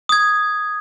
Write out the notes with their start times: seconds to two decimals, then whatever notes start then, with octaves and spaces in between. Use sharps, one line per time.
0.09 D#6 G#6